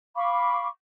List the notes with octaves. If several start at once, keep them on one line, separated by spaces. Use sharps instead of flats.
F5 B5 C#6 D6